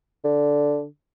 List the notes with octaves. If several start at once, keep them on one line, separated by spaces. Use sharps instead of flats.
D3